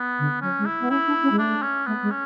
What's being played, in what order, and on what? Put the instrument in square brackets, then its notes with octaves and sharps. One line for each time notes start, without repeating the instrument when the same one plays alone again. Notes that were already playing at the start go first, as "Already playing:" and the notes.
Already playing: [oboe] B3
[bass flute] D3
[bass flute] F#3 [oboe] C#4
[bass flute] G#3
[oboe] E4
[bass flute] B3
[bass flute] C#4 [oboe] E4
[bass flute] D4
C#4
G#3
[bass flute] A3 [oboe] D4
[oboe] C#4
[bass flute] A3 [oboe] B3
[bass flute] G#3
[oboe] C#4